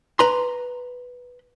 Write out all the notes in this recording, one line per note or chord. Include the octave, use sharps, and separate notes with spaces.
B4 A#5 C6